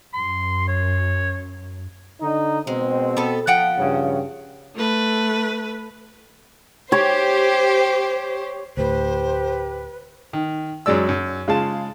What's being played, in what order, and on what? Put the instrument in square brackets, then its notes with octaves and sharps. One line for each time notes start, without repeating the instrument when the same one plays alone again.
[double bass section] F#2 [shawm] C6
[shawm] C#5
[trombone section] D3 D#4
[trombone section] B2 C4 [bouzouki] G#3
[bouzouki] B3 A4
F3 F#5 G5
[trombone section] G2 C#3
[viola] A3 B4
[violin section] G4 [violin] C5 [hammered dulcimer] C#5
[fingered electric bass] D2 A2 [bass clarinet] G4 [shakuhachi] B4 [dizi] C5
[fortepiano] D#3
F#2 F#3 G#3 D5 E6
F#2
C#3 G#3 F4 A5